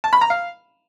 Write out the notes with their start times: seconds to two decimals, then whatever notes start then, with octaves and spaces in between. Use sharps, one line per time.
0.04 A5
0.13 B5
0.21 A#5
0.30 F5